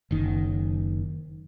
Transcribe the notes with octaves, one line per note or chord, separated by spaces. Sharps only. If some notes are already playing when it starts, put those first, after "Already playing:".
F#1 D#3